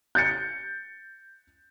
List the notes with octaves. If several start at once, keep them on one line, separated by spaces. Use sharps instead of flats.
G6 A6 C#7